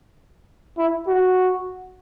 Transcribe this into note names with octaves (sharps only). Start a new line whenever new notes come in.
E4
F#4